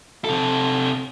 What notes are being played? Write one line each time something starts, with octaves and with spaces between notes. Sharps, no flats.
C3 A4